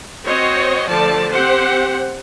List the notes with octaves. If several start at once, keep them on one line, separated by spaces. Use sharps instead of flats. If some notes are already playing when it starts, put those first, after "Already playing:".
C4 F#4 C5 C#5 D#5
D3 F3 A3 D5 A5
C4 G4 C5 F#5